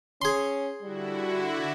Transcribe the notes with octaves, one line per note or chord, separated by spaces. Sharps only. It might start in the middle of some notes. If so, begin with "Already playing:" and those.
C#4 G#4 C6
D3 G3 E4 F#4